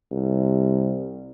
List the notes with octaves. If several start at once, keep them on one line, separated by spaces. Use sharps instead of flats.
C2